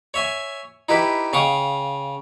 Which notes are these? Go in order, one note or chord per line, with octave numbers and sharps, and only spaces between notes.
C#5 E5 G#5
D#4 E4 G4 B4
C#3 F5 G5 C#6 D#6